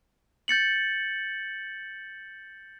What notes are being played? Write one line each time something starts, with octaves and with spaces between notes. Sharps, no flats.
G6 A6 C#7 F#7